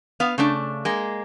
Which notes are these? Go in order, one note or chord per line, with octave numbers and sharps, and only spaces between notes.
B3 F5
C#3 A3 D4
G#3 A#3